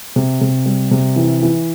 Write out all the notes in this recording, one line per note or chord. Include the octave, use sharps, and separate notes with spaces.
C3
C3
G3
C3
E3
E3